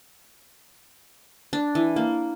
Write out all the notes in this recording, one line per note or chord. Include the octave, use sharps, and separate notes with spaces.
D4
E3
A#3